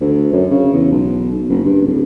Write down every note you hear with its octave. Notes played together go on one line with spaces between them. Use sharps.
D2
F#2
C#3
E2
B1
F#1
G2
D1